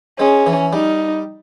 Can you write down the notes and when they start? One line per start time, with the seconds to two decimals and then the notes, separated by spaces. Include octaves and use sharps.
0.19 G#3 C#4
0.47 E3
0.73 G3 D#4